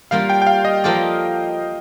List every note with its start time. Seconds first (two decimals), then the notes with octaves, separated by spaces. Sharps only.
0.11 G3 A#3 F4 F5
0.29 G5
0.42 G5
0.47 F5
0.65 D#5
0.84 F3 A#3 F4 A4 D5